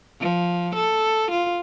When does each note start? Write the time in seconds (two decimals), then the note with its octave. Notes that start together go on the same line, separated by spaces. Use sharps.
0.20 F3
0.75 A4
1.31 F4